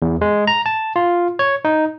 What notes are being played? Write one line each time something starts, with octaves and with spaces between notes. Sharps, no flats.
E2
G#3
A#5
A5
F4
C#5
D#4